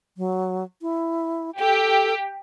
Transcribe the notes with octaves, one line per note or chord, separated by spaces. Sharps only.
F#3
E4
G4 A4